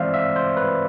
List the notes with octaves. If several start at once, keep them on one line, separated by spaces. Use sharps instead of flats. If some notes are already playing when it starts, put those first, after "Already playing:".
Already playing: E3 G#3 C4 C5 D5 E5 F5
E5
C5
B4